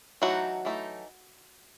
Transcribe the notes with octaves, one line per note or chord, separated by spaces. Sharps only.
E3 F#3 A3 D#4 F#4
E3 A3 D#4